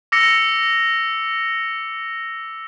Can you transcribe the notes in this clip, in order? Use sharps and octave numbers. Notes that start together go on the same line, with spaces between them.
D6 E6 A#6 C#7